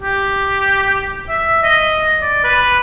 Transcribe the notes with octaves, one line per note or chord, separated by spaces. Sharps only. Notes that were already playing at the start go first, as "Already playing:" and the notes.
G4
E5
D#5
D5
B4